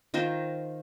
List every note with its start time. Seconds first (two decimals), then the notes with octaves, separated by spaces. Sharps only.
0.14 D#3 F4 A#4 C5